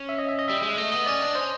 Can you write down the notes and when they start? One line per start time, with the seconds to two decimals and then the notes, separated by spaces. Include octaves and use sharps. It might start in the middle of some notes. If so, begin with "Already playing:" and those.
Already playing: C#4
0.09 E5
0.18 D#5
0.29 E5
0.39 D#5
0.48 G3 E5
0.62 G#3
0.77 A3 D#5
0.92 B3 D#5
1.06 C#4 D5
1.22 D4
1.35 C#4 C5